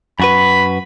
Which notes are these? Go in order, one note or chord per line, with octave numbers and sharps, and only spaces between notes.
F#2 F#4 B4 B5